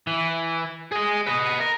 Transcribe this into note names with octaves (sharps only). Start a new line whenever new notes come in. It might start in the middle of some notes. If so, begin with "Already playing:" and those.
E3
G#4 D#5
B4 D#5
A#4